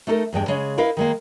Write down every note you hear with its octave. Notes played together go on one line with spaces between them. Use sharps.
A3 B3 D#4 A4 A#4
E2 G2 G#3 G5
C#3 G#3
E4 A#4 B4 D#5 F5
D#3 G#3 A#3